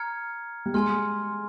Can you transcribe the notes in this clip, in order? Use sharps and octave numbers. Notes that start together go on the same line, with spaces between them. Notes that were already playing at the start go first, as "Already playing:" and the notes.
Already playing: A#5 F6 G#6 C#7
G3
G#3 G#5 C6 F6